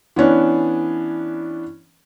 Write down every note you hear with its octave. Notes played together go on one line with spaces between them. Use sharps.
E3 B3 C#4 D4